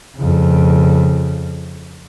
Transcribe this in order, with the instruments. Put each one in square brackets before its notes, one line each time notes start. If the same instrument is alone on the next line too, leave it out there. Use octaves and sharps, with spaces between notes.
[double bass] F2 C#3